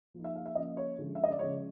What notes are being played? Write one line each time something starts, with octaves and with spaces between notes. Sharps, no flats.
F3 A#3 D#4
E5
F5
E5
F3 A#3 C#4 D#5
C#5
D3 F3 G#3 C#4
E5
D#5
D5
C#3 F3 G#3 C#5